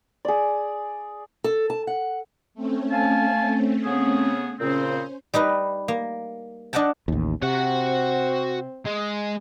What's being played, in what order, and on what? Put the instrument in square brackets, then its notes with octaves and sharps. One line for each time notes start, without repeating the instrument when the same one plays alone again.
[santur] G#4 D5
[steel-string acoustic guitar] A4
A5
F#5
[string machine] A3 C4 C#4
[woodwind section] F5 G#5 A5
C#3 B3 G#4
[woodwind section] A#2 C#3 C4 [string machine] C#4 C5
[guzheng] G3 D#4 B4 D#5
A#3
D4 D#5 F#5 G5 A5
[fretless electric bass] A1 D#2
[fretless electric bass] C3 [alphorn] C4 [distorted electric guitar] F#4 F#5
[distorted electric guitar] G#3